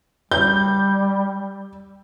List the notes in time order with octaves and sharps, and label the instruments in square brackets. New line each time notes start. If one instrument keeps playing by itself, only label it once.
[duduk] G3 [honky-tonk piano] G6